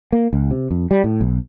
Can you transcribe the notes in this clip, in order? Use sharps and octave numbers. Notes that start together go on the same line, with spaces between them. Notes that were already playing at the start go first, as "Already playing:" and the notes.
A#3
C#2
C3
F2
G3
A2
B1